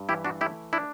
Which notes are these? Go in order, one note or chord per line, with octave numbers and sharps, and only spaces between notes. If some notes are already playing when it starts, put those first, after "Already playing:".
Already playing: G2
E3 E4 G4
D4 F#4
A3 E4 G4
D4 E4